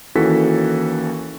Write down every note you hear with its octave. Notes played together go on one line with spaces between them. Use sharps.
D#2 E3 C#4 F#4 A4 B6